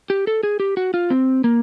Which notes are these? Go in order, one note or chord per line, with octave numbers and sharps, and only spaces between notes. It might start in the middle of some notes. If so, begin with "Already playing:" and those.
G4
A4
G#4
G4
F#4
F4
C4
A#3